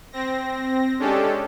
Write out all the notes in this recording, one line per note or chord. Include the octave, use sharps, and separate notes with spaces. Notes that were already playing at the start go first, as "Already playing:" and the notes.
C4 A#6
G#3 C#4 D4 G4 A4